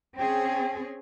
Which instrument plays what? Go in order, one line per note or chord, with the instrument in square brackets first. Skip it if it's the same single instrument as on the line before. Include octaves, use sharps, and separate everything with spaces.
[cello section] C4 C#4 G#4 [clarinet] G5